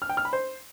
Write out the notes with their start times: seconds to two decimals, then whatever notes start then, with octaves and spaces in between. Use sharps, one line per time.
0.02 F6
0.09 G5
0.17 F6
0.25 B5
0.33 C5